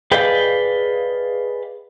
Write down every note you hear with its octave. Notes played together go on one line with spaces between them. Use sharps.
G#4 B4 D5 D#5 F5 G5